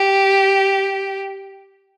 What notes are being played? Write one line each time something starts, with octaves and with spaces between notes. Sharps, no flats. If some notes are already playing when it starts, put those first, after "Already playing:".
Already playing: G4